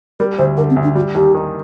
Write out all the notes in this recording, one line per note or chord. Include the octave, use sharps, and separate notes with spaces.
G3 A#4
D2 C5
D3 A#4
C4
D2
D4
G3 F#4
D#2 G4
D#3